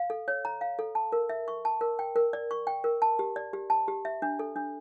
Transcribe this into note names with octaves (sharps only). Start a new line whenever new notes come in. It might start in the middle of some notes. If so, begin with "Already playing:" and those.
Already playing: F5
A4
C#5
A#5
F5
A4
A5
A#4
E5
C#6
A5
A#4
G5
A#4
D5
C#6
G5
A#4
A5
G4
D5
G4
A5
G4
E5
D4
A4
D4